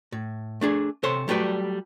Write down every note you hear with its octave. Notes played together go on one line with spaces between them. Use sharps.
A2
A3 D4 G#4
C3 A4 C5 C#5 C6
F#3 G3 A3 B4 D5